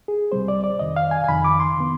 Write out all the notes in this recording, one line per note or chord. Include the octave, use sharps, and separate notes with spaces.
G#4
C2 C3 G3 C4 C5
D5
D5
F2 C3 D#3 D#5
F5
G#5
G#5
F2 C3 D#3 B5
D6
C6
D#3 B3